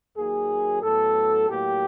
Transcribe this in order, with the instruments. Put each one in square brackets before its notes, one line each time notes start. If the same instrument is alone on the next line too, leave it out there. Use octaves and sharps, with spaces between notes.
[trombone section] D#2 D#3 F#3 A#3 G#4
A2 F#3 B3 A4
A2 F#3 A#3 G4